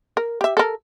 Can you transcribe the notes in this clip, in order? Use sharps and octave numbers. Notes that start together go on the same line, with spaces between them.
A#4
G4 E5
A4 A#4